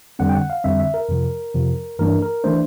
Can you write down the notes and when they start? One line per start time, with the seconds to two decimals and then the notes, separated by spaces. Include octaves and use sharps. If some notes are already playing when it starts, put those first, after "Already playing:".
0.19 F2 D3 G3 C4 F#5
0.29 G5
0.35 F#5
0.50 F5
0.64 F2 D3 G3 C4 E5
0.80 E5
0.94 A#4
1.09 F2 C3 F3
1.54 F2 C3 F3
1.99 G2 E3 A3 D4 A#4
2.22 A#4
2.44 E3 A3 D4 C5